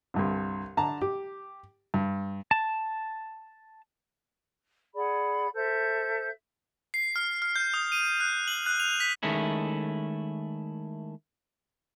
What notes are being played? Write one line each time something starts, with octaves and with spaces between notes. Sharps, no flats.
C2 G2 D3
D3 A5 A#5
G4
G2
A5
G#4 D5 F#5 B5
A4 C5 E5 G6
C7
F6
F6
G6
D#6
D#7
F#6
F#7
F#6
F7
B6
D#3 G#3 A3 C#4 E4